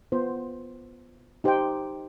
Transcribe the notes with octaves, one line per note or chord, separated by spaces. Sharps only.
B3 F4 C5
D#4 G4 C5 G5